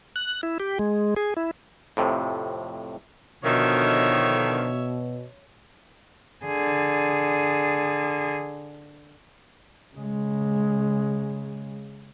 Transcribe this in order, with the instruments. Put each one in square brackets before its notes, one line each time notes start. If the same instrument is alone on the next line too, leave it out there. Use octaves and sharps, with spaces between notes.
[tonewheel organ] F#6
E4
G4
G#3
G#4
E4
[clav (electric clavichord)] F2 A2 C3
[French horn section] B2 [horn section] D3 D#3 F3 [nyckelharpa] C#5 E5
[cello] D3 G#4
[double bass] C#3 G#3